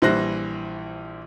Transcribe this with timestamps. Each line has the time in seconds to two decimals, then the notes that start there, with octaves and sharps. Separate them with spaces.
0.02 A#1 E3 G3 C5 F#6 A#6